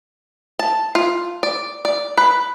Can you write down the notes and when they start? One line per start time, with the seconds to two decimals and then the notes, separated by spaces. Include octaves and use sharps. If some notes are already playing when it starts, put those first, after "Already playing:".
0.59 A5
0.95 F4
1.43 D5
1.85 D5
2.17 B4